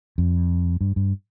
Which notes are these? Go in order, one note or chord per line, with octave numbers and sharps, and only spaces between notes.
F2
G2
G2